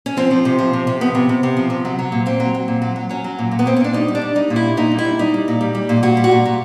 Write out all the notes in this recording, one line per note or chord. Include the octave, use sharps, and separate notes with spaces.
C#4
F3 C4
F3
C3
F3
C3
C3
F3 B3
C3
C3
C3
F3
C3
F#3
F#3
A#2
A#2 C4
F#3
F#3
A#2
F#3
F#3
F#3 C#4
F#3
A#2
A#2
B3
A#2 C4
C#4
A#2 D4
G3 D#4
G3
D4
G3
G3 D#4
A#2
E4
G3
A#2 D#4
G3
E4
G3
G3 D#4
G3
A#2
G3
G3
A#2
A#2 F#4
G3
F#4
A#2
A#2